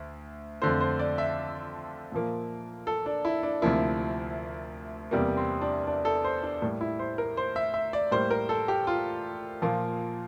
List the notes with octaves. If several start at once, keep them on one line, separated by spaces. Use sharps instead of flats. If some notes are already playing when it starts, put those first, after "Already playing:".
Already playing: D2
F2 D3 A3 C5
C5
D5
E5
A#2 F3 A#3
A4
D4
E4
D4
D2 C3 F3 A#3 E4
E2 C3 G3 A#3
C4
D4
D4
A4
C5
D4
A2 G3 A#3
E4
C5
A#4
C5
E5
E5
D5
A2 G3 A#3 C5
A#4
A4
G4
F4
A#2 F3 A#3